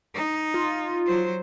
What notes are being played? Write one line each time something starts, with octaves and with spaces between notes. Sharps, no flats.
D#4
F4
F#3 C5